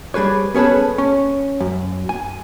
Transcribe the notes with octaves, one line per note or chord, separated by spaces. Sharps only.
G3 G#4 B4 C#5
B3 C#4 G#4 A4 B4
C#4
F#2
G#5